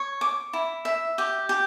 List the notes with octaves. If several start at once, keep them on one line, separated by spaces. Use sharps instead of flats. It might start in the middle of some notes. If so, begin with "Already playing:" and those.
Already playing: C#5
D6
E4
E5
G4
G4